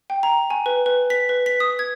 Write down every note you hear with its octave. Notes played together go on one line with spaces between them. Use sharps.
G5
A#5
G#5
B4
B4
B6
B4
B6
D#6
G#6